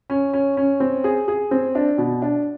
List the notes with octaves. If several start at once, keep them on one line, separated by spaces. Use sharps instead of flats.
C#4
C#4
C#4
C4
G#4
G#4
C4
D4
B2
D4